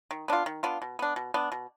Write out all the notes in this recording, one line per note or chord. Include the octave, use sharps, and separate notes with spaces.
D#3
B3 D4 F4
D#3
B3 D4 F4
B2
B3 D4
B2
B3 D4
B2